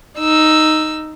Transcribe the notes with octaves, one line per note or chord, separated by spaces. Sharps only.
D#4 E6